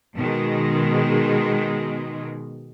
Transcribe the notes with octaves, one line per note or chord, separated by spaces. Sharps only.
B2 D#3 G#3